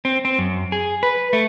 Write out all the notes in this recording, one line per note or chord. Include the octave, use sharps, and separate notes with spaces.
C4
C4
F#2
G#4
B4
A3